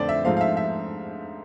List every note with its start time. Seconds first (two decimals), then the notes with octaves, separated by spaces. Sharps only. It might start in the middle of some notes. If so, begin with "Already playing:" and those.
Already playing: F2 D3 A3 C4 C5 D5
0.09 E5
0.25 G#2 F3 A3 C4 F5
0.37 F5
0.41 E5
0.57 E5